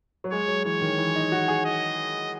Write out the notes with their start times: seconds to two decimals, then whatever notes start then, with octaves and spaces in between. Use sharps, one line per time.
0.24 F#3
0.31 G#3 C#5
0.48 F#3
0.65 E3 C#5
0.81 D#3
0.98 E3
1.15 D#4
1.32 F#4
1.48 G#4
1.65 D#5